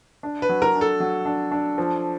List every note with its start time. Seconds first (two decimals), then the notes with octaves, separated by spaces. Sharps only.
0.23 D4
0.42 B4
0.49 F#3
0.62 A#4
0.75 D4
0.81 A4
1.00 F#3
1.26 D4
1.51 D4
1.78 F3